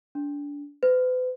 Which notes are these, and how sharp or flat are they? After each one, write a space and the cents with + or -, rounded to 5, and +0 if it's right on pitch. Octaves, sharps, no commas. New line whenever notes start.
D4 -25
B4 +40